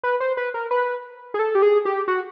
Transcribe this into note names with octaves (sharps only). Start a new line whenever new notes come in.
B4
C5
B4
A#4
B4
G#4
A4
G4
G#4
G4
F#4